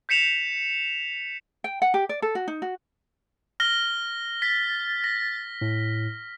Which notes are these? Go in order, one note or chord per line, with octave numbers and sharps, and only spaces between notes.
G6 B6 C#7 E7 F7
G5
F#5
G4
D5
A4
F#4
D#4
F#4
F6 A#6 G7
A6 B6
A#6
A2